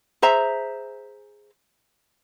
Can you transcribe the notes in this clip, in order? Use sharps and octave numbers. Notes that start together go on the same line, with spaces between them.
G#4 C5 E5 A#5